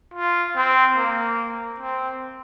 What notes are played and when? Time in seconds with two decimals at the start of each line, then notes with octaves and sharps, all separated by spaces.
0.14 F4
0.56 C4
0.97 A#3
1.80 C4